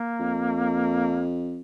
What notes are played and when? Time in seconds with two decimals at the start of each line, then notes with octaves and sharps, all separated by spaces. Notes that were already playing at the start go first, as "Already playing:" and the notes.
Already playing: A#3
0.19 F2